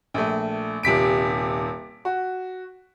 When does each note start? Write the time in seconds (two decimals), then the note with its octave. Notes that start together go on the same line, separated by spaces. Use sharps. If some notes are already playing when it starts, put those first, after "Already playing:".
0.14 A#1 A3
0.83 D#1 C3 B6 D7
2.05 F#4